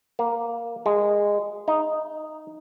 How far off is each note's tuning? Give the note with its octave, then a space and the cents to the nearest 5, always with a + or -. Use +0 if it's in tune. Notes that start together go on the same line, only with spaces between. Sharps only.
A#3 +5
G#3 -15
D#4 -5